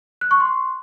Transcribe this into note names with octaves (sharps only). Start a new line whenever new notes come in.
F#6
C#6
C6